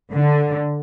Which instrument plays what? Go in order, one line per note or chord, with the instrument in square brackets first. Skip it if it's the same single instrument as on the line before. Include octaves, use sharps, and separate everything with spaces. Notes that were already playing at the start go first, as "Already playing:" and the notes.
[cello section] D3